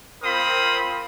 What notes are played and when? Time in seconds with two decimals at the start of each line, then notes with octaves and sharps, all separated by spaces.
0.23 C4 F4 A#4 C5 B5 D#6